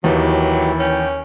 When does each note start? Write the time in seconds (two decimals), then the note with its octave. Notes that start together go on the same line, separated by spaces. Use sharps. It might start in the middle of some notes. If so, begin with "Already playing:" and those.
0.04 D#2 E3 F#3 G4
0.80 C#4 G5